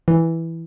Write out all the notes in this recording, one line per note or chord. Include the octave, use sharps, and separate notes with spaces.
E3